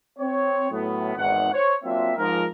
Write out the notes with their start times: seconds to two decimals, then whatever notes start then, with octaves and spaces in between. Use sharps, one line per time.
0.19 C4 C#5
0.71 A2 F#3 B3
1.16 G#1 E2 G#2 F#5
1.53 C5 C#5
1.84 F#3 A#3 C4 D4 F4 E5
2.17 G#2 F3 A#4